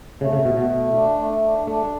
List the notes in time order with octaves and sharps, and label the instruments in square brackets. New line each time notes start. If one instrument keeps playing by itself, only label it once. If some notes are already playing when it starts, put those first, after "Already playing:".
[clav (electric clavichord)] C#3 [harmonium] A3
[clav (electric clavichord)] C#3
[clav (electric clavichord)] B2 [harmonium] A3
[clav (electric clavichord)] B2
[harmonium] A3
D4
A3
D4
[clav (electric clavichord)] A3 [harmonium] D4